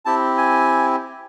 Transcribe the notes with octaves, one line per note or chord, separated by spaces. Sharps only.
C4 E4 G4 A5
G#5